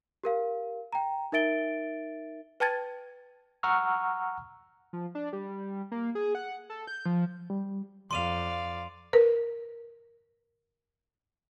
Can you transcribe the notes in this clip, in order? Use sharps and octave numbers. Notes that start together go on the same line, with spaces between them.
G4 A#4 F5
G5 A#5
D#4 A#4 E5 A6 D7 G7
B4 G5 A5 G#6 A6
F#5 A#5 C#6 E6 F6
F3
D4
G3
A#3
G#4
F#5
A4
G6
F3
G3
F2 D5 F5 C6 D#7 F7
A#4 B4